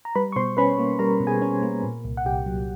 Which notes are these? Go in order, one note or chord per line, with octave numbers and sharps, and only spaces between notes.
A#5
G3 B4 B5
C#6
B2 C5 C6
C#4 B4 B5
A#3
G3 A#4 A#5
B2
G#4 G#5
C#4
A#3
A#2
C2
F#5
C2 G4 G5
F#3